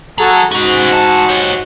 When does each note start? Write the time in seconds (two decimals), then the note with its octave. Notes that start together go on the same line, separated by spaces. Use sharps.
0.18 F#3 F#4 G#4 A4
0.51 G#2 C#4 F#4 D#5
0.93 E2 A5
1.29 G4 C#5